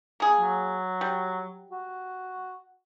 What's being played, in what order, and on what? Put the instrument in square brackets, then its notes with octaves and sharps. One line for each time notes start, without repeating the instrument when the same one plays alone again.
[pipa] A#3 G#4
[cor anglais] F#3
[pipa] G3
[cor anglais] F#4